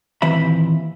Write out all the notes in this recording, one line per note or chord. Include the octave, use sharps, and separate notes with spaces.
D#2 A#2 E3 C4 E5 B5